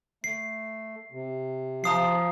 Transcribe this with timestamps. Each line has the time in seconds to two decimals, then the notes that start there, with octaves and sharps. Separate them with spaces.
0.24 A3 C7
1.11 C3
1.84 F3 A#5 D#6 C7